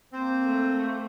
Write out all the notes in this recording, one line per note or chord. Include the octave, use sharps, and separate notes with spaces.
A#3 C4 C5
A3